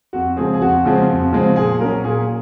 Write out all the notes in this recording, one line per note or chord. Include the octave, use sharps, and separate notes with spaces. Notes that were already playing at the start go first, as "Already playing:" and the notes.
F2 F#4
C#3 F3 G#3 C4 G#4
G#4
F2 F#4
C#3 F3 G#3 C4
F2
C#3 F3 G#3 C4
A#2 G#4
F#3 C#4 A#4
A#2 G#4